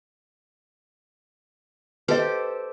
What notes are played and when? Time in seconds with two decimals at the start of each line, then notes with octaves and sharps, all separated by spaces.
2.08 G4 A4 B4 C5 D#5